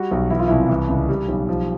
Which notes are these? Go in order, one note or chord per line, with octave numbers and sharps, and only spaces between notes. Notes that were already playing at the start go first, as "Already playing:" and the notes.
Already playing: G3 F#4
B1
E3 E4
F4
C2 E4
E3
C#2
G3
B1
F3